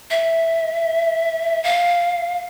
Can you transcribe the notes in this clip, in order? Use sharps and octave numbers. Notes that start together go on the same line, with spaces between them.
E5
F5